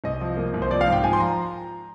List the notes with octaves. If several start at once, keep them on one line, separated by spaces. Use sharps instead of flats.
C2 D#5
F3
A#3
C2
C5
F3 D5
F5
G#2 G5
F3 G#5
C6
A#5